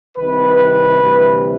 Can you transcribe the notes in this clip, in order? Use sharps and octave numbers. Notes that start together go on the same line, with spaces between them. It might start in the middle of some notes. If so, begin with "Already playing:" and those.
C2 C3 D#3 B4
D2 C3 E3 G3